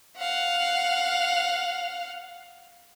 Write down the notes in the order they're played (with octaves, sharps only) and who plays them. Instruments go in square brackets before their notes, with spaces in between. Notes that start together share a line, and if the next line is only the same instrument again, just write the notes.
[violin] F5 F#5